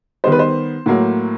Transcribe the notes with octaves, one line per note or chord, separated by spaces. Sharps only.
D#3 G3 B3 C5
B4
C5
A2 F#3 A#3